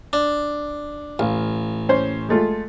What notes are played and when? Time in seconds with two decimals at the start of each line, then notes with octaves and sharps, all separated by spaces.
0.13 D4
1.19 A1 F5
1.89 C#4 C5
2.29 G#3 A3 F4